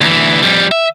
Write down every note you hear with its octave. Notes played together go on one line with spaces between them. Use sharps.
D2 E3
F2 G3
E5